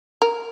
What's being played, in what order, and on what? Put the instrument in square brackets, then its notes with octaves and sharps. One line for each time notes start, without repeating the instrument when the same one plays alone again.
[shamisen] A#4